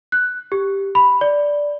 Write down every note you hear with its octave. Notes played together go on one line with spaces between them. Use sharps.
F#6
G4
B5
D5